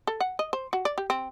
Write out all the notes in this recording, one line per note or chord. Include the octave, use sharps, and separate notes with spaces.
A4
F#5
D#5
C5
F#4
D5
G4
C4